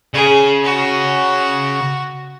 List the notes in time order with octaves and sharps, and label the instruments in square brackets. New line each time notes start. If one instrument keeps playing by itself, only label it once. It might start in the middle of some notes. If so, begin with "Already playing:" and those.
[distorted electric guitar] C#3 [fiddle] G#4
[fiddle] F#4